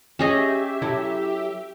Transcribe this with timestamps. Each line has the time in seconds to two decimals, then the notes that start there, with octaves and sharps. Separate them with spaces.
0.19 C#4 G4 G#4 D#5 E5
0.82 F#3 E4 A4